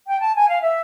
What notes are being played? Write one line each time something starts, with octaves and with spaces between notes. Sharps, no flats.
G5
A5
G#5
F5
E5